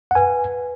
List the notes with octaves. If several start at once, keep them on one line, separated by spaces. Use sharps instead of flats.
F#5
B4 G#5